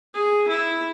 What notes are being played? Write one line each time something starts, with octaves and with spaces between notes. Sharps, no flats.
G#4
E4